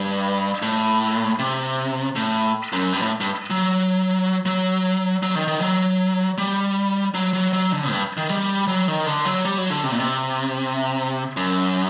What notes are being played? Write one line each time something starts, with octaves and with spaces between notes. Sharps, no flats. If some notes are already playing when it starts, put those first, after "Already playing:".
Already playing: G2
A2
C3
A2
F#2
G2
A2
G2
F#3
F#3
F#3
D#3
D#3
F#3
G3
F#3
F#3
F#3
D3
G2
D#3
G3
F#3
D#3
D3
F#3
G3
F#3
D3
C3
A#2
C3
F#2